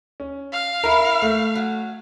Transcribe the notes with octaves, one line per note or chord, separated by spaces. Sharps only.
C#4
F5
A#3 E4 A#4
A3
F#3